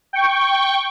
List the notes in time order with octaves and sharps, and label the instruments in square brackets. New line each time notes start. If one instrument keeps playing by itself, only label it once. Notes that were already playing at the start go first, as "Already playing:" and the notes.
[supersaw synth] G5 C#6